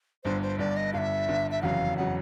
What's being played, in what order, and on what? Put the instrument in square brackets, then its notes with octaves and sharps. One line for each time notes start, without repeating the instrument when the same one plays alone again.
[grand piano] G1 G2 D3 [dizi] C5
[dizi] C5
[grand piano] G1 G2 D3 [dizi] D5
[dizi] D#5
[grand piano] G1 G2 D3 [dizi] E5 F5
[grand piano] G1 G2 D3
[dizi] E5
[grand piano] F1 E2 C#3 F#3 [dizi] F5 F#5
[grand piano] F1 C#3 F#3 [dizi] F#5